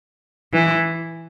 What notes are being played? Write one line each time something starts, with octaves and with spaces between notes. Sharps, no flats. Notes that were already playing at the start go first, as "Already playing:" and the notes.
E3